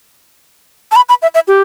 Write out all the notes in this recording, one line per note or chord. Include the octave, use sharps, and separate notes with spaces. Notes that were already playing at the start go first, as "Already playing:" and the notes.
A5
B5
B5
E5
E5
G4